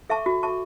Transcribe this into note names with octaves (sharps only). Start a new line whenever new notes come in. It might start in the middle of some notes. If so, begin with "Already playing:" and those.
A4 E5 A5 C#6
F#4
A4 E5 A5 C#6